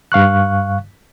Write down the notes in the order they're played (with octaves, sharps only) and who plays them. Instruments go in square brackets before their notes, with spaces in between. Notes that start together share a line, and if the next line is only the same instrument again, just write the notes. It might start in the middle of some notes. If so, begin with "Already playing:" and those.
[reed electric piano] G2 F5 C#6 F#6